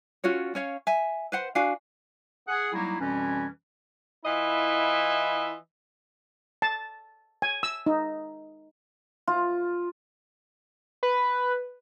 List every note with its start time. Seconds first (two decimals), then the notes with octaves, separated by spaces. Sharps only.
0.24 C#4 F4 F#4 C#5
0.55 C#4 C#5 F5
0.87 E5 G#5
1.32 B4 C5 F#5
1.55 D4 F#4 F5 G#5
2.48 G#4 F#5
2.73 F#3 G3 A#3 D#4 E4
3.00 F2 B2 E3 G3 C#4
4.25 E3 E4 F4 D#5 E5
6.62 A5
7.42 G#5
7.63 E6
7.86 D#4
9.27 F4
11.03 B4